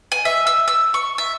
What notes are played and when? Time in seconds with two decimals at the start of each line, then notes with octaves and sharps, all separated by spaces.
0.12 G#5
0.25 E5
0.47 E6
0.68 E6
0.94 C#6
1.18 E5